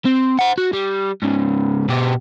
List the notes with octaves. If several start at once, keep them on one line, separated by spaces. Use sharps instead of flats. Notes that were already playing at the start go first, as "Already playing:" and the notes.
C4
C5 F#5
F#4
G3
G#2 C#3
B2 G4